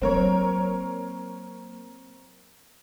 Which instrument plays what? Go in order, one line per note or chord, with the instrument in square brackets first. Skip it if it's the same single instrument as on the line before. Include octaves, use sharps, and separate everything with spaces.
[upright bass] F#3 A#3 [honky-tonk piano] C4 A#4 C#5